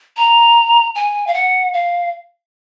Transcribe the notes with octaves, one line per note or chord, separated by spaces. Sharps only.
A#5
G#5
F5
F#5
F5